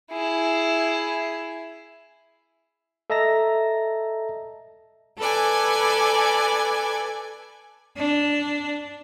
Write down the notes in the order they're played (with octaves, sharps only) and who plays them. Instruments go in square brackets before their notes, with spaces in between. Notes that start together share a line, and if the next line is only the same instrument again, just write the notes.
[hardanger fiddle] E4 G#4
[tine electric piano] A4 D#5 E5 A5 A#5 A#6
[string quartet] A4 B4 D5 G#5
[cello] D4